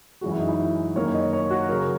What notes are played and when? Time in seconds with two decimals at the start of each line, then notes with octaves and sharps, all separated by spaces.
0.21 F#2 E3 G#3 F#4
0.31 E4
0.40 D#4
0.49 E4
0.96 F#2 D#3 A#3 C#5
1.14 D#5
1.33 C#5
1.50 F#4
1.69 C#3 F#3 A#4